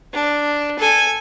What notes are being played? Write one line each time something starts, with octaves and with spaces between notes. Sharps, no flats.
D4
A4 G#5